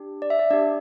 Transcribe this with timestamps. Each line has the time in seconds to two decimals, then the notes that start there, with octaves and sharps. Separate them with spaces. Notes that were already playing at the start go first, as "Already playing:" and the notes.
Already playing: D4 G4
0.22 D5
0.30 E5
0.39 D5
0.51 D4 G4 D5